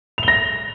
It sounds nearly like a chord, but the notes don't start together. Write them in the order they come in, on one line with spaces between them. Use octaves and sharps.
F7 G7 A#6